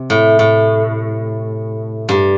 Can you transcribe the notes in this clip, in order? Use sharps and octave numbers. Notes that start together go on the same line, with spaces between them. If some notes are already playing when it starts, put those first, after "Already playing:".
Already playing: C3
A2
A2
G2